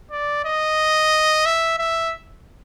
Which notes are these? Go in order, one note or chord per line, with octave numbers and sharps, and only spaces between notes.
D5
D#5
E5
E5